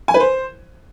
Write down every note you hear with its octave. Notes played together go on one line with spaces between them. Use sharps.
G#5
B4
C5